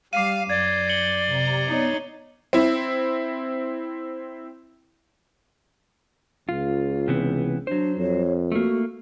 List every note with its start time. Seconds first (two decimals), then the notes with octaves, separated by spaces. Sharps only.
0.13 G3 F5 D6 C7 D#7
0.50 F#2 D5 G6 G#6 A#6
0.89 C#7 F#7 G7
1.26 C3 A#5
1.69 B3 D#4 C#5 A6
2.53 C4 E4
6.49 C#2 F4
7.08 C3 E3 B3
7.67 F#3 D4 C5
7.98 F2 C#5
8.52 A3 A#3 F#4